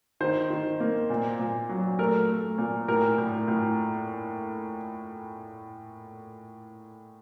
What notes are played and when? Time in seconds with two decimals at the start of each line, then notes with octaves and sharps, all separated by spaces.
0.21 D#3 C5
0.50 D#3
0.80 A#3
1.10 A#2
1.39 A#2
1.69 F#3
1.99 A3 A#4
2.29 A3
2.58 A#2
2.88 A2 A#4
3.18 A2
3.48 A2